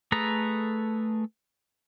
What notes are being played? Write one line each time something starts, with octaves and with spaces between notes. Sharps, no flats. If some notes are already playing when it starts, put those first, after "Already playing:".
A3 G#4 A4 B4 A#5